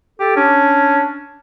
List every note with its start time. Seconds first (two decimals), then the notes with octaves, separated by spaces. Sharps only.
0.20 G4 A4
0.36 C#4 D4